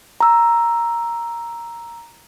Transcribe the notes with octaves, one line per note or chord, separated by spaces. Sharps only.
A#5 E6